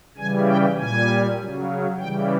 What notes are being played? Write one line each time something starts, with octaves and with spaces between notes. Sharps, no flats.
C#3 E3 G3 G#5
G5
A#2 G3 G#5
C#3 F#3
C#3 E3 G3 G5